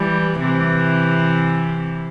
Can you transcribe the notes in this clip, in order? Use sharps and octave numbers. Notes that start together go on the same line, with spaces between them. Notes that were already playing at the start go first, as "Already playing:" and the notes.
Already playing: E3 G3
C3 E3